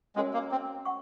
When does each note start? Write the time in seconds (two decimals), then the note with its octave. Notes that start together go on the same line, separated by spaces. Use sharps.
0.16 G#3 C#4 F#4 A#4 C#5 G#5
0.33 A#3
0.51 C4
0.85 F#5 C#6